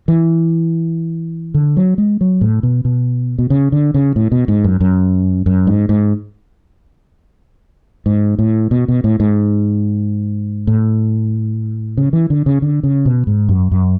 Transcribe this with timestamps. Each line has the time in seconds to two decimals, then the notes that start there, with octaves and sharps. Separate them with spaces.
0.08 E3
1.54 D3
1.77 F#3
1.98 G#3
2.21 F#3
2.41 A2
2.63 B2
2.85 B2
3.39 B2
3.50 C#3
3.72 D3
3.94 C#3
4.16 A2
4.32 B2
4.48 G#2
4.64 F#2
4.81 F#2
5.46 F#2
5.67 G#2
5.89 G#2
8.06 G#2
8.39 A2
8.71 B2
8.88 B2
9.04 A2
9.20 G#2
10.67 A2
11.97 C#3
12.13 E3
12.30 D3
12.46 C#3
12.62 D3
12.83 C#3
13.06 B2
13.27 G#2
13.49 F#2
13.72 F#2